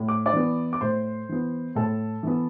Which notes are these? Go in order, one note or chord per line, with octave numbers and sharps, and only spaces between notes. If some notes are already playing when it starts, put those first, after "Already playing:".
Already playing: A2
D6
D5 D6
E3 B3
D6
A2 C5 C6
E3 B3
A2 A4 A5
E3 B3